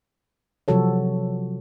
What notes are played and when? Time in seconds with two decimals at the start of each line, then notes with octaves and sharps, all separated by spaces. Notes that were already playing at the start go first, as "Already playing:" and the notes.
0.68 C3 F3 F#3 F#4 A4 C#5